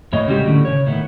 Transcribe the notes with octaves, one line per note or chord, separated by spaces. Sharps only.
E2 A2 C#5 D#5
C#3 G3 G#3 A#3 F#4 G4
A2 D3 C#4
C#3 C#5
A2 D#3 B3